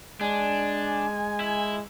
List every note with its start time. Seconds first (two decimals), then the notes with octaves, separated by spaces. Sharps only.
0.21 G#3 D4 G#5
1.40 E4